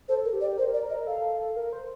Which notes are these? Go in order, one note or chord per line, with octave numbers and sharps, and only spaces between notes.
A4 C5
A#4
G4
D5
A#4 C5
D5
A#4
D#5
A4 F5
A#4
C5